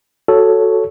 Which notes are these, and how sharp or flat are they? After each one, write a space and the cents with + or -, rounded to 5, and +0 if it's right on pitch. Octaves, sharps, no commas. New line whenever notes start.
F#4 +0 A4 +0 C#5 +0